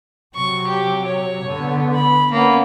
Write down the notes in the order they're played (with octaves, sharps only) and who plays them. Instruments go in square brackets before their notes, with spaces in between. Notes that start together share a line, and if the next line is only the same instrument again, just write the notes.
[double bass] C3 F#3 [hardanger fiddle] C#6
[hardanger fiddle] G4
C#5
[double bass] D3 B3
[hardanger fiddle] B5
[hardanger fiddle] A#3 B3 [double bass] C#4